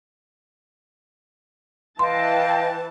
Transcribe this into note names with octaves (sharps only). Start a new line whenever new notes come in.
E3 B4 D#5 F5 G5 A5 C6